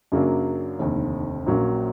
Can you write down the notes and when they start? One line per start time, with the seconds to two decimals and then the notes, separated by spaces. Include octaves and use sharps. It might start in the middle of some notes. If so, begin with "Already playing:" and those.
0.12 F#2 C#3 F#3 A#3 D4
0.79 F1 D#2 D3
1.46 A#1 A#2 F#3 A#3 C#4